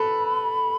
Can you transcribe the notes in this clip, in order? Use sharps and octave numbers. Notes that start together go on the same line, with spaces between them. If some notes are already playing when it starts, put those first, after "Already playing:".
Already playing: A4 B4 B5